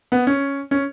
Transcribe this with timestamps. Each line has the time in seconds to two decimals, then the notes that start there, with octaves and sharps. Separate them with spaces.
0.12 B3
0.27 C#4
0.71 C#4